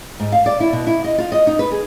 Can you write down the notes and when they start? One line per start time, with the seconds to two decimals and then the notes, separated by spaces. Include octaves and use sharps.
0.20 G#2
0.32 F5
0.46 D5
0.60 E4
0.73 B2
0.87 E4
1.04 D#5
1.18 F4
1.32 D#5
1.47 D#4
1.59 B4
1.72 G#4